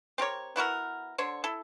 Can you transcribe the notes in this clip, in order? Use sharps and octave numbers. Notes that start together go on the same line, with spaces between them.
C4 G4 A#4 C#5
B3 E4 F#4 A#4
D3 C5 C#5
E4 A4